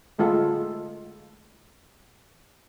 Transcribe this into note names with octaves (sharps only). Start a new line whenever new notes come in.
D3 G#3 A3 F4 A4